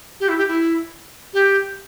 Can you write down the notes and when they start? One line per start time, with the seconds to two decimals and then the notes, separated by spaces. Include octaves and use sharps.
0.20 G4
0.29 E4
0.38 G4
0.48 E4
1.34 G4